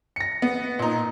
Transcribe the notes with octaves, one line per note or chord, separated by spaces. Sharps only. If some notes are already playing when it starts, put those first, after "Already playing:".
A#6 C#7
B3
A#2 D#4